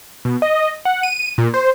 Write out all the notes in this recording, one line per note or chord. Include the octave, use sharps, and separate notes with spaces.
B2
D#5
F#5
D#7
A#2
C5